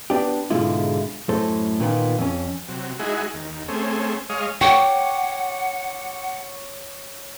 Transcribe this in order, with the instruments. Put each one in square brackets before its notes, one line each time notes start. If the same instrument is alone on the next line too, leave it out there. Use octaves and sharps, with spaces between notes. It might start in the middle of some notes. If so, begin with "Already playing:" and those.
[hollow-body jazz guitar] B3 D4 G4
G#2 B2 D3 G#3 E4 F4
F#2 A2 A4 C5
A#2 D#3 B3 F4
F2 C#4
[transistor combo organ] C3 F#3
G#3 D#4 E4 F#4 G#4
D#2
A3 C4 C#4 G#4
G#3 C#5 D#5 F5
[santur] C#5 D6 [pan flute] F#5 [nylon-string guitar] G5